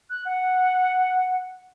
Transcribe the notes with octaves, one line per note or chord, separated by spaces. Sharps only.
F#6
F#5